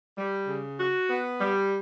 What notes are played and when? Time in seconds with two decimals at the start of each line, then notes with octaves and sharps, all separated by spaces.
0.17 G3
0.48 C#3
0.78 F#4
1.09 B3
1.40 G3